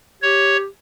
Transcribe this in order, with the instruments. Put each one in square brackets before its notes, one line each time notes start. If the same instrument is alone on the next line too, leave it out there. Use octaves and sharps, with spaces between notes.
[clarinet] G4 [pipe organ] C#5